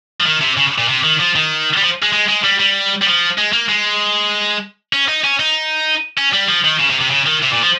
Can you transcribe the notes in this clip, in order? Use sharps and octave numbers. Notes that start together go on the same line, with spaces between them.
F3
D#3
C3
C#3
A#2
C3
D#3
F3
D#3
G3
F3
G#3
G#3
G#3
G3
G3
G3
F3
G#3
A#3
G#3
C#4
D#4
C#4
D#4
C#4
G3
F3
D#3
C#3
C3
C3
C#3
D#3
C3
A#2
F3